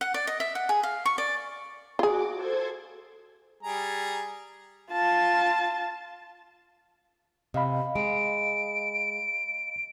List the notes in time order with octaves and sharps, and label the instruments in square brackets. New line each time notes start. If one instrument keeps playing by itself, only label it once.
[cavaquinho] F#5
D5
D#5
E5
F#5
G#4
F5
C#6
D5
[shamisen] F4 G#4 [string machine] F#4 D6
[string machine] A4 C5 G#6
[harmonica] G3 G#4 A#5
[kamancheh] F4 A5
[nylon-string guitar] C3 [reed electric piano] D#5 F5 B5
[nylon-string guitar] G#3 [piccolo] D7